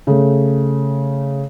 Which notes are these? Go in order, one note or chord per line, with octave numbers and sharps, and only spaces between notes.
C#3 A3